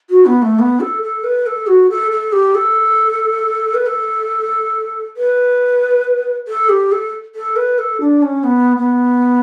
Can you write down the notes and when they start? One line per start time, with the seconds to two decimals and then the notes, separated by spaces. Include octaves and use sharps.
0.10 F#4
0.26 B3
0.42 A3
0.59 B3
0.80 A4
1.03 A4
1.24 B4
1.46 A4
1.67 F#4
1.90 A4
2.11 A4
2.33 G4
2.55 A4
3.75 B4
3.86 A4
5.17 B4
6.48 A4
6.69 G4
6.92 A4
7.35 A4
7.56 B4
7.79 A4
8.01 D4
8.22 C#4
8.44 B3
8.78 B3